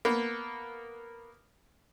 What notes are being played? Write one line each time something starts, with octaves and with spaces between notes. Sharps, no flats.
A#3 B3